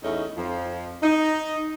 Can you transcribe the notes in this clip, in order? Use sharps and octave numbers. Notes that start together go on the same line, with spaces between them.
E2 A3 C#4 D#4
F2 F3
D#4